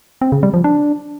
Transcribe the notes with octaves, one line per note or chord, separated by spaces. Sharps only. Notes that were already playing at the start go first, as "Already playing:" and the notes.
C4
C#3
G3
F3
D4